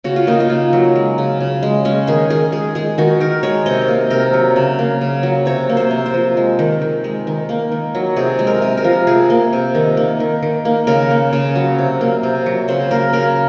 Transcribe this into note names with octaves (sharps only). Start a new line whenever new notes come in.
C#3 F#4
F4
A#3 D#4
F4
C#3
F#3
G#3
C#3
C#3
G#3
G#3 C#4
D#3 G#4
D#3 G#4
G#3 G#4
G#3 G#4
D#3 F#4
D#3 A#4
G#3 C#5
C3 D#5
A#3
C3 A#4
F#3
C#3
A#3
C#3
F#3
C3 C#5
A#3
C5
C3
C5
F3
G#3
D#3
D#3
G#3
D#3
A#3
D#3
F#3
C3 G#4
G#3
A#4
C3
A#4
F3
C3 G#4
A#3
C3
D#3
A#3
D#3
D#3
A#3
C#3 A#4
A#3
C#3
F#3
C3
A#3
C3
F#3
C#3 C5
A#3 A#4
C#3 A#4